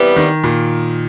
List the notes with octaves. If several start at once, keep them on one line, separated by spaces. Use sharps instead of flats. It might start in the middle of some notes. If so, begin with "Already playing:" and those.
Already playing: C3 E3 G3 B3
D#3
A#2